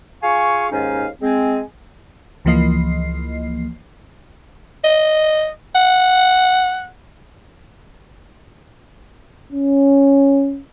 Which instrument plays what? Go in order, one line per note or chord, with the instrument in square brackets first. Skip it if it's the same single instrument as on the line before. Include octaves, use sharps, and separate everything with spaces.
[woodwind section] F4 G#4 F5 G#5 C#6
D#2 G#2 C#4 D#4 F5 G#5
G#3 C4 G#5
[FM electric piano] C#2 E3 F3 A#3 D#5 C7
[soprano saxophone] D#5
F#5
[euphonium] C#4